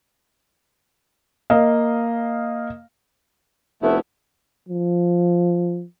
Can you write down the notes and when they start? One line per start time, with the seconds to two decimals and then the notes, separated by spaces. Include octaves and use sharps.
1.50 A#3 D#5 F5
3.82 F1 A3 B3 E4
4.68 F3